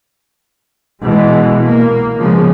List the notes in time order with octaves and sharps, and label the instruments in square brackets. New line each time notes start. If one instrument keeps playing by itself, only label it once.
[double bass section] B2 E3 G#3
A#3
C#3 F3 G#3 B3